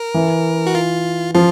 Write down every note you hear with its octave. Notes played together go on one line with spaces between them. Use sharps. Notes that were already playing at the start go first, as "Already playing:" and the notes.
Already playing: A#4
E3
F#4
F4
F3 F4